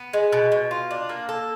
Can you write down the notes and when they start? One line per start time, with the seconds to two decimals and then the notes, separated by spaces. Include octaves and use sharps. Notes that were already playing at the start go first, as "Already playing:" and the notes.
Already playing: B3
0.13 G#3
0.33 B2
0.52 B2
0.71 F4
0.91 D4
1.09 A#3
1.29 A4